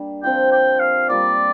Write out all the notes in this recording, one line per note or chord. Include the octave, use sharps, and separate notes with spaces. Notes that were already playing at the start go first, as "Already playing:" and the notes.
Already playing: G3 A#3 D4 G4
F3 C4 F4 G5
G5
F5
G3 A#3 F4 D5